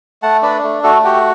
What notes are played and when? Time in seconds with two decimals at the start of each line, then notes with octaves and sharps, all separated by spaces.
0.23 A3 F#5 A5
0.42 D4 B4 D5
0.64 A3
0.83 A3 F#4 A4
1.04 F#4 G4